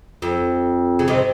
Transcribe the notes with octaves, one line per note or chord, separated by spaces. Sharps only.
F2
C#3
C3 D#3